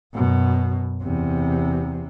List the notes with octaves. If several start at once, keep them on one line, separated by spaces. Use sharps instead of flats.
F#2 B2
E2 C3